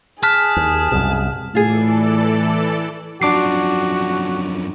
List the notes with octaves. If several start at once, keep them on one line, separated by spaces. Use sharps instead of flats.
G#4 A5 F6 F#6 B6
D#2
C2 F#2 B2
A2 E3 F4 G#4 A4 D5
F#2 F3 D4 F#4 D6 C7